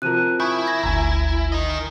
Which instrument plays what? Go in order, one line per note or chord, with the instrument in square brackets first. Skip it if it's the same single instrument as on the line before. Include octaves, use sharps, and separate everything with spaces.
[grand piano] C3 F3 A#4 [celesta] F#6 D#7
[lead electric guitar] E4 [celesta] G#5 C#6 G6 [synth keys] B5 D#6
[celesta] G#6 A#6
[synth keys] G1 D2 [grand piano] G#5 A#5
[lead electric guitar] A#4 D#5